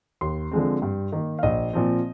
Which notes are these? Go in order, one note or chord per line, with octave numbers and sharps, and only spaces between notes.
D#2 C6
D3 F3 G#3 C4
G2
D#3 A#3
F5
A#1 D#5
A#2 F3 C4